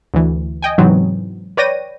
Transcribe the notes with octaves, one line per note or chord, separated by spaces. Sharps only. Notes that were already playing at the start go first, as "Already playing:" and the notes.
D2 E3
D#5 G5 G#5
G#2 C3 E3 F#3 B3 C4
B4 C#5 D5 G5 A#6 D#7